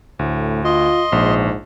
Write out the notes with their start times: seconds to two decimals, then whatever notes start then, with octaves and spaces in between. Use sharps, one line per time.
0.19 D2 A2
0.65 F4 D#5 C6
1.12 A#1 G#2